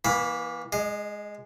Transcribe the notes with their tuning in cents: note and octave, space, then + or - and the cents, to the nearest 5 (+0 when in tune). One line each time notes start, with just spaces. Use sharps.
E3 -15 A#3 +30 B5 +0
G#3 +0 D#5 -40